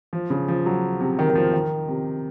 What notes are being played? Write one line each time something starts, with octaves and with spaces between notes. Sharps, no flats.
F3
C#3
F3
F#3
C3
D#3
D#3
F3
D#3
C3